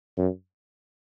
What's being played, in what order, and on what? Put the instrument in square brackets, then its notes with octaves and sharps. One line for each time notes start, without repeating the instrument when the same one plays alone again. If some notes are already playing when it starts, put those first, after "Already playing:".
[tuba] F#2